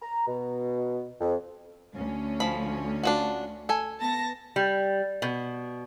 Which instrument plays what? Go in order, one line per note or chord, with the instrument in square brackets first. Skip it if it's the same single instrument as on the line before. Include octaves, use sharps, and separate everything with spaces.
[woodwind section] A#5
B2
F2
[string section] D2 C#4
[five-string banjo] F3 B5
D4 F4 F#4
A4 G#5
[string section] B3 A5 A#6
[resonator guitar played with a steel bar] G3
B2